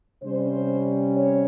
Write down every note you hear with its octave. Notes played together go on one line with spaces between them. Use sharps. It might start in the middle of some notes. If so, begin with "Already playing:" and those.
C3 G3 C#4 C5
C#5